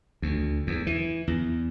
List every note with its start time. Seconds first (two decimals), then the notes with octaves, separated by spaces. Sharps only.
0.22 D2
0.67 E2
0.87 E3
1.27 E2